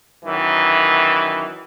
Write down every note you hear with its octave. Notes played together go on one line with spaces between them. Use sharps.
F#2 D#3 E3